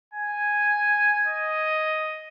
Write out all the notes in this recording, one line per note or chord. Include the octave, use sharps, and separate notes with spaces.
G#5
D#5